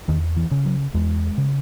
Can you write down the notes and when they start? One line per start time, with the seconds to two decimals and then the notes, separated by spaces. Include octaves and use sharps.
0.08 E2 D#3
0.36 E3
0.51 C#3
0.65 F#3
0.94 E2 G#3
1.38 C#3